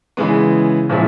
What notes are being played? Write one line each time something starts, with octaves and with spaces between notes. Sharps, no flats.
C#3 E3 G#3 B3
A#2 F3 G#3 C#4 E4